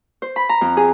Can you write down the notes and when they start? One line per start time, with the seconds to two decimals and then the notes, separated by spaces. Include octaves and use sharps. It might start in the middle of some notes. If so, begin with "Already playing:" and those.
0.22 C5
0.36 B5
0.49 A#5
0.61 F2
0.77 G#4